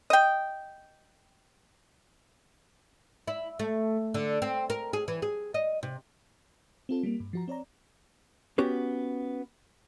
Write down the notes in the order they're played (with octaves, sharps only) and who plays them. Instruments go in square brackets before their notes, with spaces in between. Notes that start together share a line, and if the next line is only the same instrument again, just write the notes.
[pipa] D#5 G5
[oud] E4
A3
D3
C4
A#4
G#4
E3
G#4
D#5
C3
[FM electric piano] C4 F4 A4
G3 A#3
G2
F3 F#4 A#5
C4 C#5 D5 A#5
[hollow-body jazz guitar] B3 C#4 F#4 G4